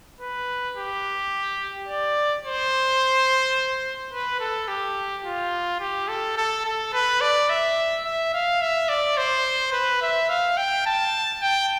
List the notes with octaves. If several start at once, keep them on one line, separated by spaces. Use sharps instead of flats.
B4
G4
D5
C5
B4
A4
G4
F4
G4
A4
A4
A4
B4
D5
E5
E5
F5
E5
D5
C5
B4
E5
F5
G5
A5
G5